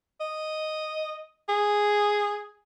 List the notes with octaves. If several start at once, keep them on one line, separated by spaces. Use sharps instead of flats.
D#5
G#4